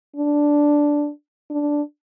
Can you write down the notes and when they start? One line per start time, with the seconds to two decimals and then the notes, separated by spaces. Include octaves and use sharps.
0.16 D4
1.50 D4